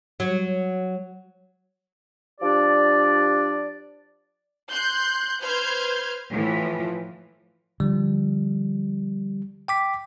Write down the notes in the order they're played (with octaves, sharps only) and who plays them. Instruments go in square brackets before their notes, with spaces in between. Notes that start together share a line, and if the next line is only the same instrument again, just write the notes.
[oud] F#3
[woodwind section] F3 D4 G4 D5
[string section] C6 F#6 G6
B4 C5 F6 G6 G#6
A2 E3 F3
[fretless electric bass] D3 F3 [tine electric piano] G3
[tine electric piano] G5 D6 B6